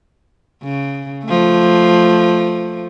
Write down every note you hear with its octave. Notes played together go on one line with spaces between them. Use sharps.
C#3
F3 A3